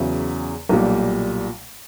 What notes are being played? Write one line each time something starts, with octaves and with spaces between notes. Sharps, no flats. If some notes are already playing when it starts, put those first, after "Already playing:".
Already playing: E2 C#3 F#3 E5
B1 A#2 G3